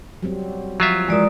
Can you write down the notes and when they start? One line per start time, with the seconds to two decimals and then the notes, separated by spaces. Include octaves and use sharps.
0.23 F#3 G3 C4
0.80 F3 F#3 F4 E5
1.08 E3 F3 G#3 A#4 D5 D#6